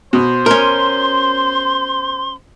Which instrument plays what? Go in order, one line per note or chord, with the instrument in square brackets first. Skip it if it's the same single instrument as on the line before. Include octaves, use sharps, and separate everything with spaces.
[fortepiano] B2 [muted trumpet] C5
[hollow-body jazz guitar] C#4 A#4 [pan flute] C6